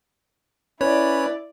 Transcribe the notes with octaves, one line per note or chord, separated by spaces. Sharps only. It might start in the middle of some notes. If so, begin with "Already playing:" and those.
C#4 E4 B4 C#5 D5